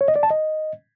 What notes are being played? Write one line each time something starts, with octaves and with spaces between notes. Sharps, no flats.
C#5
D#5
D5
A5
D#5